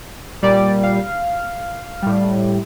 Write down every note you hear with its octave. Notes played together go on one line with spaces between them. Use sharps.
A#2 G3 D5
F5
A2 G3